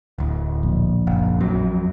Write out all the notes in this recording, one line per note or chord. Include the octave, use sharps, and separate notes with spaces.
D1 D2
A#1
F#1
F2 F#3